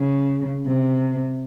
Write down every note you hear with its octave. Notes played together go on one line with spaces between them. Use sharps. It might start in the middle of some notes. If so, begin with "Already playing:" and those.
Already playing: C#3
C3